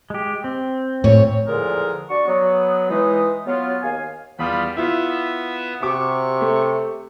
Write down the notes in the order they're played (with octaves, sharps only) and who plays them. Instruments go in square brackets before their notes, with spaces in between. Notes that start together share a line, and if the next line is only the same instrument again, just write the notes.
[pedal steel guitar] G#3 G4
C4
[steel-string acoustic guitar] D2 C#5 [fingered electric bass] A2
[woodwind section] E2 A#2 D3 F3 G#3 A#4
D4 F#4 D5 C#6
F#3 B3
E3 G#3 D#4
F#3 B3 F4
D#2 F5 G#5
[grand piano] E2 D#6 [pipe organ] G3 F4 B5
[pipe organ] B3 E5 [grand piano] E4 F4
[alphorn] C3 [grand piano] F#4 G4 D6 [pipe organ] C#6
[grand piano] A3